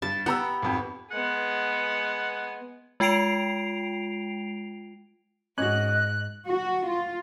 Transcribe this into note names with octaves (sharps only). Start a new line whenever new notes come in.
G2 A5
B3 G4 F#5 A#5 E6
G#1 F2
G#3 B3 F#5
G#3 F4 G5 C7 D7 F7
G#2 C#4 F#4 D#5 F#6
F#4
F4